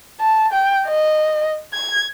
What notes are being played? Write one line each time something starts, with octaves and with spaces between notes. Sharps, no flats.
A5
G5
D#5
G#6